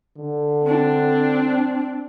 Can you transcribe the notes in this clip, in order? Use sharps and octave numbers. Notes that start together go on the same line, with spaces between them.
D3
C4 D4